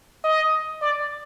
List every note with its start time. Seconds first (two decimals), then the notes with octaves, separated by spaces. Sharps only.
0.24 D#5
0.82 D5